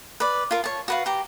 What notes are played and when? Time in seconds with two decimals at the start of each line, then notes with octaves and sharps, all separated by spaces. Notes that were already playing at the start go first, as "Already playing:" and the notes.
0.20 B4 D5
0.51 F4 A#4
0.64 C#5 A5
0.88 F#4 B4 F5
1.06 G4 A#5